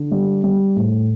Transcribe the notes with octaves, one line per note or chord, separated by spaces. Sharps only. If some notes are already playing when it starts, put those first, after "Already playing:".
Already playing: D3
G3
G3
A2